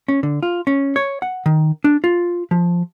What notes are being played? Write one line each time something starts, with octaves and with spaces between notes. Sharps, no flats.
C#4
D3
F4
C#4
C#5
F#5
D#3
D4
F4
F3